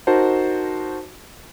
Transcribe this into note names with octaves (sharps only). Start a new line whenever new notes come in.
D#4 F#4 A#4 C5 A5